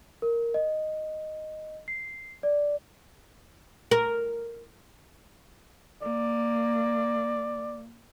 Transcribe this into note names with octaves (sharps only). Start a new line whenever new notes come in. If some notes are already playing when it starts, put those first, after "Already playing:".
A#4
D#5
C7
D5
A#4
A#3 D5